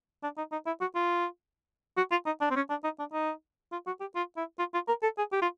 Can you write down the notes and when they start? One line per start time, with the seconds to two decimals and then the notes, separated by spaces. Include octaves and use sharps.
0.23 D4
0.38 D#4
0.52 D#4
0.67 E4
0.81 F#4
0.95 F4
1.97 F#4
2.11 F4
2.26 D#4
2.41 D4
2.51 C4
2.56 C#4
2.70 D4
2.84 D#4
2.99 D4
3.13 D#4
3.72 F4
3.87 F#4
4.01 G4
4.16 F4
4.37 E4
4.59 F4
4.74 F4
4.88 A#4
5.03 A4
5.18 G#4
5.32 G4
5.42 F4